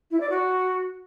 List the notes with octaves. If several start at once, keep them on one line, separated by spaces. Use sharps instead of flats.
E4
D5
F#4